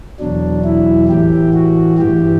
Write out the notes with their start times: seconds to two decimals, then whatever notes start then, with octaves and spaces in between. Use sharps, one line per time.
0.20 E2 B2 F#3 D4
0.64 E4
1.09 A2 E3 G4
1.54 F#4
1.99 G2 E3 G4